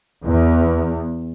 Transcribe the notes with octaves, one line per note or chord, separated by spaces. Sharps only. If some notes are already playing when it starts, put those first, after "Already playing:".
E2